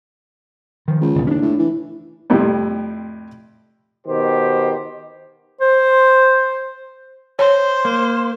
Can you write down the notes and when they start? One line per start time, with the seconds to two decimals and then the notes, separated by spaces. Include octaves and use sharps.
0.88 D#3 F3
1.01 C#2
1.15 F#1 B1
1.27 D#2 C#4 D4
1.42 A2
1.59 E3
2.30 F2 A2 C3 G3 G4
4.07 B2 D#3 G4 C5
5.61 C5
7.39 C5 C#5
7.85 A#3